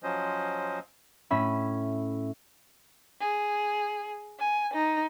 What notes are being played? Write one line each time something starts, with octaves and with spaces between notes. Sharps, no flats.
F3 F#3 C#4 C5 D#5
A2 C#4 E5 B5
G#4
G#5
D#4